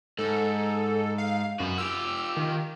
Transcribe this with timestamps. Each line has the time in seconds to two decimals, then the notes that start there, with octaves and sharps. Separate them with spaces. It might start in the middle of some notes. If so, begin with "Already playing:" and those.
0.19 G#2 A4
1.18 F5
1.60 F#2 B3 F#4
1.78 F4 G4 E6
2.36 D#3